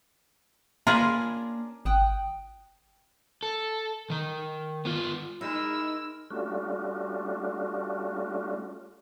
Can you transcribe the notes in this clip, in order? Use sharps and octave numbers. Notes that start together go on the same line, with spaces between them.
A#3 C#4 D4 F4 G#4 A#4 B4
G#1 G5 D#6 F#6
A4
D#3 A#5
B3 F4
G#3 D#4 E4 A#4 E6
G3 A3 C#4 D4 F4 F#4